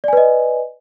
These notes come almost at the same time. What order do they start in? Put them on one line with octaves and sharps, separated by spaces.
D5 G#5 B4 D#5